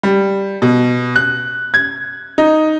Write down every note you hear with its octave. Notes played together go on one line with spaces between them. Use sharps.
G3
B2
F#6
G#6
D#4